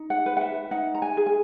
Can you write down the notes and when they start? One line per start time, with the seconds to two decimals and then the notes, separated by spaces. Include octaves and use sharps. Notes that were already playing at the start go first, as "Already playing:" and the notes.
Already playing: D#4
0.10 F#5
0.26 B4
0.37 F#5
0.41 E5
0.71 D#4 F#5
0.95 A#5
1.02 G#5
1.17 G#4
1.26 G#5